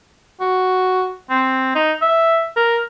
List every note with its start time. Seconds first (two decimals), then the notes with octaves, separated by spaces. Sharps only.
0.40 F#4
1.30 C4
1.75 D#4
2.01 E5
2.56 A#4